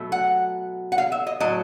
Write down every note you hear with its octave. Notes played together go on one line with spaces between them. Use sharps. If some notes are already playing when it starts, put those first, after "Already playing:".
Already playing: B2 F#3 A3
F#5
F#5
F5
E5
D#5
A2 F#3 D#5